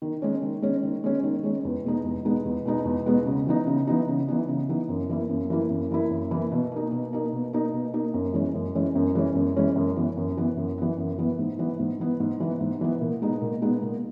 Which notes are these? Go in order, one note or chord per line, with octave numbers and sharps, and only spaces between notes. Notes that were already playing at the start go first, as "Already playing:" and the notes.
D#3
G#3 C#4
D#3
G#3 C#4
D#3
G#3 C#4
D#3
G#3 C#4
E2
B2 G#3 B3 D#4
E2
B2 G#3 B3 D#4
E2
B2 G#3 B3 D#4
E2
B2 G#3 B3 D#4
C#3
E3 B3 D#4
C#3
E3 B3 D#4
C#3
E3 B3 D#4
C#3
E3 B3 D#4
F#2
E3 A#3 E4
F#2
E3 A#3 E4
F#2
E3 A#3 E4
F#2
E3 A#3 E4
B2
A#3 D#4
B2
A#3 D#4
B2
A#3 D#4
B2
A#3 D#4
F#2
E3 G#3 C#4
F#2
E3 G#3 C#4
F#2
E3 G#3 C#4
F#2
E3 G#3 C#4
F#2
E3 B3
F#2
E3 B3
F#2
E3 B3
F#2
E3 B3
G#2
E3 B3
G#2
E3 B3
G#2
E3 B3
G#2
E3 B3
A#2
G#3 B3 D#4
A#2
G#3 B3 D#4
A#2